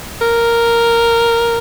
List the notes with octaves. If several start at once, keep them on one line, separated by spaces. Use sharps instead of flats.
A#4